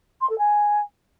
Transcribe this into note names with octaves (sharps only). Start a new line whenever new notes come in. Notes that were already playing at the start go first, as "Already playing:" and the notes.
C6
A4
G#5